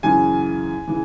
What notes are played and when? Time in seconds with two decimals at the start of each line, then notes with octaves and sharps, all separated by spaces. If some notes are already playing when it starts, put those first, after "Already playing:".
0.03 F#2 C#3 E3 G#5
0.88 C#3 E3